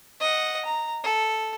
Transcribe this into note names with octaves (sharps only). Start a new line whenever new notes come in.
D#5 F#5
A#5
A4